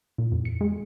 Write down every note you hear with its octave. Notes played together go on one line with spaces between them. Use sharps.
A#2
F2
C#7
G#3